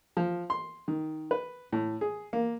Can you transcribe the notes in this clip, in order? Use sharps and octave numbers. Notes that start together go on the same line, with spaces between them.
F3
C6
D#3
B4
A2
G#4
A#3